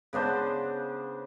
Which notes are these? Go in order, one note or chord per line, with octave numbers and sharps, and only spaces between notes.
C#3 B3 D4 C5